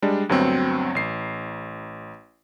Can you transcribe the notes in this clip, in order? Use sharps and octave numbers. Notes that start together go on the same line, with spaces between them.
G3 G#3 D4
D2 G2 F#3 B3 C4
A1 C7